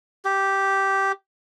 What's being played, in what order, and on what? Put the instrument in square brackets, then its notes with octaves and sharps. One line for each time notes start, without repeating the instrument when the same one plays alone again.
[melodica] G4